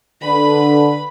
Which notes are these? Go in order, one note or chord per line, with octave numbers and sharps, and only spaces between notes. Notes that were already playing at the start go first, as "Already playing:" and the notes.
D3 B4 B5